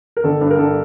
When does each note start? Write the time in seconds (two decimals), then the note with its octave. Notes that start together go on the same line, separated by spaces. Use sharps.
0.17 A#4
0.24 G1 A4
0.41 G2
0.51 A#4
0.59 G2 A4